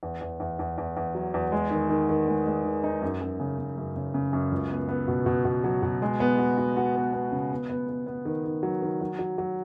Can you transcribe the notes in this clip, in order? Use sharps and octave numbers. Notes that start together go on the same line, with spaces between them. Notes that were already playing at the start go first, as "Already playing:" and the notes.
E2
E2
E2
E2
E2
E2
F#3
E2
G#3
D#3
D#3
D#3
G#3
G#3
D#3
D#4
F#2
F#2
C#3
C#3
F#2
C#3
C#3
F#2
C#2
B3
B3
B2
B2
B2
F#3
B2
G#3
B3
F#4
F#4
F#4
B3
B3
C#3
B3
B3
B3
B3
D#3
D#3
F#3
D#3
F#3
F#3
F#3